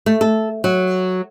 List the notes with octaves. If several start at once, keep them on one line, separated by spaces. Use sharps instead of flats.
A3
A4
F#3